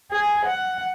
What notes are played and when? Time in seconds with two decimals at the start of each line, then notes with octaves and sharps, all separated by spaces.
0.11 G#4
0.46 F#5